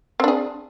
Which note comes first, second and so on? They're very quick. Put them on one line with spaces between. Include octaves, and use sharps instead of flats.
C4 D4 G#4